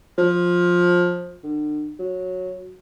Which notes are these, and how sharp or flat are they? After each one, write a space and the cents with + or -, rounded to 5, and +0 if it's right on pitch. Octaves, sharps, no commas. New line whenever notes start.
F3 +15
D3 +40
F#3 -10